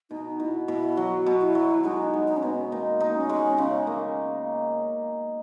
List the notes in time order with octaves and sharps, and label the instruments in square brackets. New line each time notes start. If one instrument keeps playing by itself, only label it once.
[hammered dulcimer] B2 [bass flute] D#4
[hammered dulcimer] B2 [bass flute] E4
[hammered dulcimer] B2 [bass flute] E4
[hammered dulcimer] F#3 [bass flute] F#4
[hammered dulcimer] B2
[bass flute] E4
[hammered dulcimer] F#3
[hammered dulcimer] G#3 [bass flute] D#4
[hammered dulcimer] G#3
[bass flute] D#4
C#4
[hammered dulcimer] B2 [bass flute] B3
[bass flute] C#4
[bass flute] A#3 [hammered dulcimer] D#4
[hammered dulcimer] D#4
[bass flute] C#4
[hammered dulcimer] G#3
[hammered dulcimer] C#3 [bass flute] C#4
[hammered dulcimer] A#3